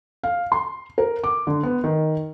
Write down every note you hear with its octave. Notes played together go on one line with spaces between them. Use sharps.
F5
C6
A#4
D6
D3
B3
D#3